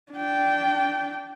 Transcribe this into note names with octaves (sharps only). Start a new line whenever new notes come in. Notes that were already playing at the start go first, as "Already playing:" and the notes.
D4 G5